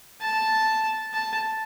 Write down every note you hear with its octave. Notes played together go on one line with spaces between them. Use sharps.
A5
A5